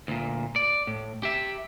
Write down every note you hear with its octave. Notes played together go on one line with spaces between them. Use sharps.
D2 A#2
D5
A2
G4 E5